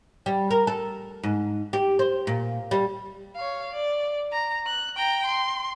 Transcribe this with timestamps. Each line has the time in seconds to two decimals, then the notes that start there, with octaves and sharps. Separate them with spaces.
0.26 G3
0.51 A#4
0.67 A4
1.23 G#2
1.73 G4
1.99 C5
2.27 A#2
2.71 G3
3.35 C#5 F5
3.73 D5
4.32 A#5
4.67 F#6
4.97 G5 A#5
5.26 C6